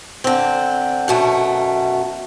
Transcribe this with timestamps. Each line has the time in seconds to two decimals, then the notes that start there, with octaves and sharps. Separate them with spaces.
0.24 D3 C4
1.08 F#2 B2 A3